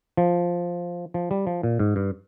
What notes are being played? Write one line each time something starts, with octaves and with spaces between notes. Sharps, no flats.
F3
F3
G3
F3
A#2
G#2
G2